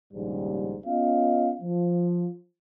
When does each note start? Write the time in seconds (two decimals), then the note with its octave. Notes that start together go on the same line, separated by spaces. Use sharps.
0.14 A#1 D#2 G#2 C#3 G3
0.85 B3 C#4 F4 D#5 F5
1.61 F3